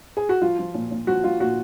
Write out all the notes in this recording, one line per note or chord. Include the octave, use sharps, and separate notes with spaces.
G#4
F#4
F3 F4
F3
A#2
A#2
F3 F#4
F3 F4
A#2 F#4